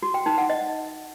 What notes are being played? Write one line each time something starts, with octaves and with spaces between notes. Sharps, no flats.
F#4
G5
D#4
F#5
D#5